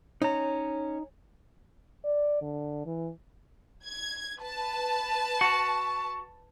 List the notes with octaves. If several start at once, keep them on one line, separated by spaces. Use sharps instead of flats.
C#4 D#4 A#5
D5
D3
E3
G#6
B4 A5
F#4